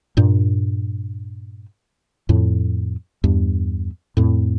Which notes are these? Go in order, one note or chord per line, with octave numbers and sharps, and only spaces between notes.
G2 A#2
F2 A2
E2 G2
F2 A2